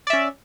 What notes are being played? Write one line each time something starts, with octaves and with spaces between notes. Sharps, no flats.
C#4 D5 E5